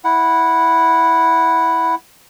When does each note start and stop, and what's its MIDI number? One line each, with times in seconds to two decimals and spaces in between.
0.04 1.95 64
0.04 1.95 78